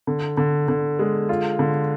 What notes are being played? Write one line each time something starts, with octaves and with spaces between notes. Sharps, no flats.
D3
D3
D3
G#3
F4
D3